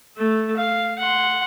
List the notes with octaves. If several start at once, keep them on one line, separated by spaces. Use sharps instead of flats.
A3 A4
F5
F#5 C6